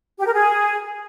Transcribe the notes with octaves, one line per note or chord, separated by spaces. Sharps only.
G4
A#4
G#4